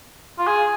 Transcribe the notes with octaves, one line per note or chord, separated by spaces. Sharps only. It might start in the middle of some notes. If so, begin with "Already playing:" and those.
F4
G#4